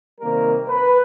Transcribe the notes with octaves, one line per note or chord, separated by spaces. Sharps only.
C3 D#3 G3 A#3 A#4
B4